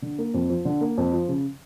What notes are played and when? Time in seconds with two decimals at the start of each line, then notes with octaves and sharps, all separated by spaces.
0.02 D3
0.19 A#3
0.34 F2
0.50 F3
0.65 D3
0.81 A#3
0.98 F2
1.13 F3
1.28 C#3